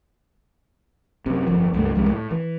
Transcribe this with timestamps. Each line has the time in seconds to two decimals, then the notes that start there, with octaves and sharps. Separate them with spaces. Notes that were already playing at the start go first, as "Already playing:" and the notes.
1.26 F#2 C3
1.47 G1 F2 F3
1.74 C#2 G2 G3 A3
1.95 C2 F2 G3 G#3
2.10 A2
2.31 E3